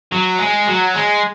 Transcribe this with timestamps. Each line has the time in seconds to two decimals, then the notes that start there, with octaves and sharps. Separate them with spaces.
0.12 F#3
0.39 G#3
0.67 F#3
0.94 G#3